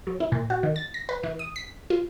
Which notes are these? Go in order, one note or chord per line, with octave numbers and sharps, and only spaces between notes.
F#3
E4
A#2
F#4
D#3
A6
A#6
B4
E3
D#6
B6
F4